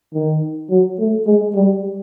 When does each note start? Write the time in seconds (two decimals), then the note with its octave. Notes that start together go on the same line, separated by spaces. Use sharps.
0.14 D#3
0.70 F#3
0.99 A3
1.27 G#3
1.55 G3